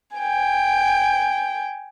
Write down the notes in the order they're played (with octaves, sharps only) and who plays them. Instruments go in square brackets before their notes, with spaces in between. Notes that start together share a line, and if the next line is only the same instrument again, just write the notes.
[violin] G5 G#5